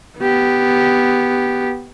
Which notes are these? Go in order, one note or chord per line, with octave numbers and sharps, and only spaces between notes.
B3 G4